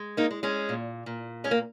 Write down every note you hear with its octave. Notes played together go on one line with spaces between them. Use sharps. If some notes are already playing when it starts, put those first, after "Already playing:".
Already playing: G#3
A#3 D#4
G#3
G#3 C#4
A#2
A#2
G#3 C#4
A#3